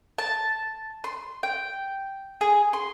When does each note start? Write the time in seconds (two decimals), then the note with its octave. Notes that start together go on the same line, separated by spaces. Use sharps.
0.18 A5
1.04 C6
1.43 G5
2.41 G#4
2.73 C6